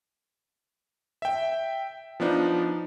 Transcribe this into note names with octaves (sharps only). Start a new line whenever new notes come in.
E5 G5
F3 B3 D4 D#4